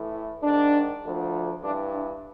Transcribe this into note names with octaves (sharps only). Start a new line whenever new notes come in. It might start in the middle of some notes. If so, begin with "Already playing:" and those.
Already playing: A2 E3
E4
G#2 D#3 D4
D2 D3 F3
G2 E3 D4
D4